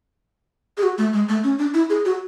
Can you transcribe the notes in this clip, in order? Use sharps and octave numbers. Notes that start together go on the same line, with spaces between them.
G#4
F#4
A3
G#3
A3
C#4
D4
E4
G#4
F#4